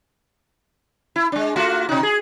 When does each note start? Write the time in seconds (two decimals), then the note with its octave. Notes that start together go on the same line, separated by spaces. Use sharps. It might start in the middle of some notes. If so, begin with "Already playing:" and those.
1.16 E4
1.32 G#3 D4
1.56 A3 F4 F#4
1.89 C3 D#4
2.03 G#4